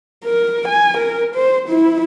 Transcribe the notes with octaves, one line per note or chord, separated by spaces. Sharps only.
A#4
G#5
A#4
C5
E4